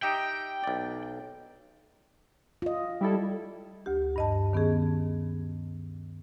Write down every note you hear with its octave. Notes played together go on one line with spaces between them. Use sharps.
D#4 G4 E5 G5
B1 D5
F4 D#5
G3 E4 A4
D2 G4
G2 D#5 A5
D#3 B3 C#4 G#4